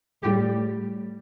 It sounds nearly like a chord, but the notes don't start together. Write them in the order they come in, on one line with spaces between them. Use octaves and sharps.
A2 G4 G3